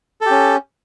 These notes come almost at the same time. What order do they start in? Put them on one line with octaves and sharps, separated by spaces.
A4 G4 C#4